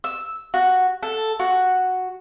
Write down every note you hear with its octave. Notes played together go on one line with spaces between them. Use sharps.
E6
F#4
A4
F#4